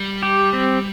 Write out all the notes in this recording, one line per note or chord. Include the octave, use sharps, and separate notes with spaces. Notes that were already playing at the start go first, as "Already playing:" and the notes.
Already playing: G3
G4
C4